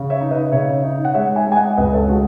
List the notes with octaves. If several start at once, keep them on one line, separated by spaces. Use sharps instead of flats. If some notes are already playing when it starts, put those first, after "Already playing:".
Already playing: C#3
C#5 E5
D#4
B4 D#5
C#3 C#5 E5
D#4
F#5
G#3 C#5 E5
E5 G#5
G#3
G#5
D#5 F#5
C#2 B4 D#5
A4 C#5
G#3 F#4 A4